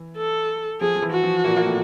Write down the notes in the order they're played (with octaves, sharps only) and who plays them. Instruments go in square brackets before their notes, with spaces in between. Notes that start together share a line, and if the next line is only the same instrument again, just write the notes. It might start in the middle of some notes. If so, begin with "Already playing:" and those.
Already playing: [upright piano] E3
[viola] A4
[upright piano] F3 [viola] G#4
[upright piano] F3
E3
[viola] F#4
[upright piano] F3
A#2 A#3
A#3
A2 A3